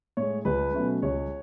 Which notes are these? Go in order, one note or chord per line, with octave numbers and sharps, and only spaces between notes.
A2 G#3 C#5
C#2 B4
B2 F#3 A3 C#4
C#2 C#5